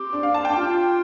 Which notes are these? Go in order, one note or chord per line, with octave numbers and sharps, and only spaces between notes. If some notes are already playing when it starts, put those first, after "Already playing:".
Already playing: C4 G4
D4
F5
A5
D4 G5
F4